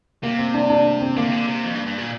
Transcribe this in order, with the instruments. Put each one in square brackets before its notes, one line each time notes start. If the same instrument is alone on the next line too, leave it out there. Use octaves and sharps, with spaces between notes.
[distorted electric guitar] C3 [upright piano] A#3
[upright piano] C4
D4
D4
C4
C4
[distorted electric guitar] D3 [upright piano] A#3
[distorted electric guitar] C3
D3
C3
F2
G2
G2
A#2